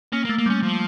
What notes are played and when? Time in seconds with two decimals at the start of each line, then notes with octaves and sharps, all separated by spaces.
0.13 A#3 C#4
0.25 A#3
0.29 A3
0.38 A#3
0.46 G3 C#4
0.63 F3